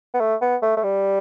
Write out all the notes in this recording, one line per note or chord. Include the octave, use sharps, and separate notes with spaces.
B3
A3
B3
A3
A3
G3